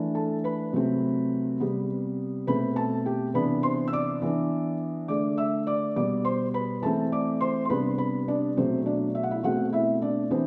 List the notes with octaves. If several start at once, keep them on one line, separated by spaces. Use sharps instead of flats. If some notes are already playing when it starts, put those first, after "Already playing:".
Already playing: E3 A3 D4
A4 A5
B4 B5
C3 F#3 A3 C4
C3 G3 B3
B2 A3 C4 B4 B5
A4 A5
G4 G5
C3 E3 B3 D4 B4 B5
C5 C6
E6
D5 D6
E3 B3 D4
D3 A3 D4 D5 D6
E5 E6
D5 D6
B2 G3 B3 D5 D6
C5 C6
B4 B5
E3 A3 C4 A4 A5
D5 D6
C5 C6
C6
C3 G3 B3 D4 B4 B5
B4 B5
D4 D5
B2 F#3 A3 C4 C5
D4 D5
E5
F#5
E4 E5
B2 A3 C4 F#4 F#5
E4 E5
D4 D5
E3 B3 C4 D4 C5